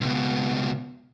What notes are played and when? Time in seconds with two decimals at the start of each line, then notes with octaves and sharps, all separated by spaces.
0.01 C#2 B2